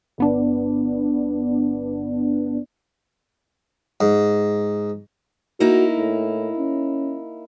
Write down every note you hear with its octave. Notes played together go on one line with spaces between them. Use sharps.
G1 B3 D4
G#2
A#3 D#4 E4 F#4
A2
C#4